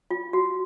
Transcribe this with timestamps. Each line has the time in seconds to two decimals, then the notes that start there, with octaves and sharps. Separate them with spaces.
0.11 F4
0.33 F#4